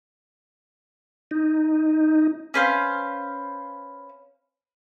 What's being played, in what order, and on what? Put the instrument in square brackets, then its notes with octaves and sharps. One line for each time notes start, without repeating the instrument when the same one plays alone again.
[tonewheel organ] D#4
[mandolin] C#4 B4 C5 F5